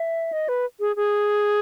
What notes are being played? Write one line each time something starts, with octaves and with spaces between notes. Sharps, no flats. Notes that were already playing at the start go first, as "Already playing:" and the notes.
Already playing: E5
D#5
B4
G#4
G#4